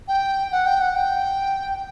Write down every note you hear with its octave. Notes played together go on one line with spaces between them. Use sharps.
G5
F#5
G5
F#5
G5